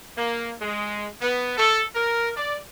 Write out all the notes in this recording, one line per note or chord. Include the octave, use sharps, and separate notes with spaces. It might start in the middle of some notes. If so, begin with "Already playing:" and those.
A#3
G#3
B3
A4
A#4
D5